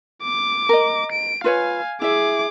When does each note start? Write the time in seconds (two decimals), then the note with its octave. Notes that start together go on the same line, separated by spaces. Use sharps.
0.23 D6
0.69 A#4 D#5
1.12 D7
1.44 F4 B4 C#5 F5 G#5
2.02 E4 G#4 E5 D6